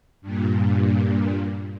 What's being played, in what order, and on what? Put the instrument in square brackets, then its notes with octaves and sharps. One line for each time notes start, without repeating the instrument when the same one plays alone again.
[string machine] G2 A#2